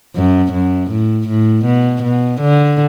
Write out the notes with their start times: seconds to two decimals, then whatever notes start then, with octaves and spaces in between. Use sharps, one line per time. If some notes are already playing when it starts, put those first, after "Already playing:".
0.16 F#2
0.53 F#2
0.91 A2
1.28 A2
1.66 B2
2.03 B2
2.41 D3